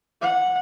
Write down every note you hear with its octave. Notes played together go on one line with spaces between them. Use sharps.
F#5